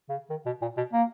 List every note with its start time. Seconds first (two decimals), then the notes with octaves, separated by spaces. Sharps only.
0.09 C#3
0.30 D#3
0.46 B2
0.61 A#2
0.77 B2
0.93 A#3